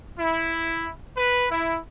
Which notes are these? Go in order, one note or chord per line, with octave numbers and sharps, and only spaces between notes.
E4
B4
E4